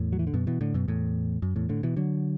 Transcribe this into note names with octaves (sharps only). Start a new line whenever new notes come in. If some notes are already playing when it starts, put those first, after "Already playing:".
Already playing: E2 A2
F#3
E3
D3
F#2 B2
B2 E3
A2 D3
F#2 B2
E2 A2
F#2
E2 A2
A2 D3
B2 E3
D3 F#3